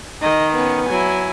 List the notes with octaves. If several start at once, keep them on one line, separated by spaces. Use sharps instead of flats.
D#3 D#5
B3 C#4
F#3 E4 G#5